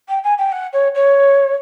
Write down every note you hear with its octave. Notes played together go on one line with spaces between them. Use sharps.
G5
G#5
G5
F#5
C#5
C#5